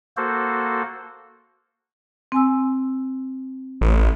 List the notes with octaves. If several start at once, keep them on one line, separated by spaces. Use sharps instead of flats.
A#3 F#4 A4 C5
C4 G#5 E6
A1